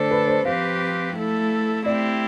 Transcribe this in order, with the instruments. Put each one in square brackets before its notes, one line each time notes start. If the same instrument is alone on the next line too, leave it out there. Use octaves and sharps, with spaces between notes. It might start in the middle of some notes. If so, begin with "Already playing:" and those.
Already playing: [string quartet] D3 A3 D4 A4 [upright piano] C5
[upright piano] B4
C5
[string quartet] F3 C4 G4 B4 [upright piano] F5
[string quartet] A3 E4 A4
[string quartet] A3 C4 E4 G4 [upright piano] D5